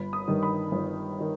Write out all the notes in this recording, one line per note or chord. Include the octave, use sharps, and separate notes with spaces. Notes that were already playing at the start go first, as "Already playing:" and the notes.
Already playing: G1 B5
D#6
G2 D#3
B5
G1
D#3